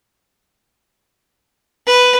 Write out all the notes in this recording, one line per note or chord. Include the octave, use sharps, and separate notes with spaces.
B4